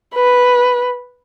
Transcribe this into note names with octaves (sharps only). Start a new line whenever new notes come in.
B4